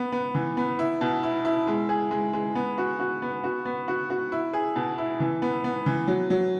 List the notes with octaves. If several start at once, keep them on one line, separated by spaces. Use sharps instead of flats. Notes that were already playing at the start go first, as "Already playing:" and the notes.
Already playing: B3
B3
E3
B3
E4
B2
E4
E4
G#3
G#4
G#3
G#3
B3
F#4
F#4
B3
F#4
B3
F#4
F#4
E4
G#4
B2
E4
E3
B3
B3
E3
F#3
F#3